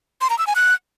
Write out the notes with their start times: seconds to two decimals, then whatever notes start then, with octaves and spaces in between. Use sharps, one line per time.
0.21 C6
0.30 A#5
0.38 E6
0.47 G#5
0.56 F#6